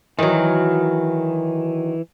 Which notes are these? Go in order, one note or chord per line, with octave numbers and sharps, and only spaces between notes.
D#3 E3 F#3